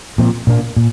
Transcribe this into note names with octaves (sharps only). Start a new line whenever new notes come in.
A#2 F3 C4
A#2 A#3 D4
A#2